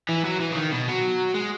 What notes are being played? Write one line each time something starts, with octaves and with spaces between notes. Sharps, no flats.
E3
F#3
E3
C#3
D#3
B2
F#3
G#3